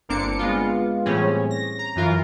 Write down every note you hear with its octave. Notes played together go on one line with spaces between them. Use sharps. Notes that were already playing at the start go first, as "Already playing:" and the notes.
G1 A#3 C4 D4 D6 C#7
G#3 B3 F4
A2 E3 G3 C4 C#4 G#4
A#6
A#5
F#2 E3 F4 A#4